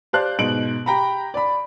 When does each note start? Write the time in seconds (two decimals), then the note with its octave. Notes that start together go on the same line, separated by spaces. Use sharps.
0.13 G4 C5 D5 F5 A5 F#6
0.39 G#2 B2 D#5 D7 F#7
0.86 G4 G5 A#5 B5
1.34 D5 B5